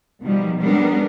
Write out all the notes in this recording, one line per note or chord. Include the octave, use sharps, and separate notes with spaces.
B2 D#3 F3 G3
G3 G#3 B3 C#4 D4 A#4